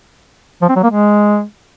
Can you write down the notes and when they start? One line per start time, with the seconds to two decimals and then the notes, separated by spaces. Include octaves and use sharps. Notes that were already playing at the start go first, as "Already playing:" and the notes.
0.62 F3
0.69 C4
0.76 F#3
0.83 A#3
0.90 G#3